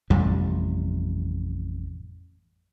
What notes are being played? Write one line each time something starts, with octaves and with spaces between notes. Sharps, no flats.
A1 F2 C3 G3